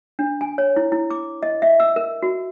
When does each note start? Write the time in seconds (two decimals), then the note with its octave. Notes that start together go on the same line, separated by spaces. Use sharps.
0.19 D4
0.41 G#5
0.58 C#5
0.76 E4
0.92 E4
1.10 D6
1.43 D#5
1.62 E5
1.80 E6
1.96 A#4
2.23 F#4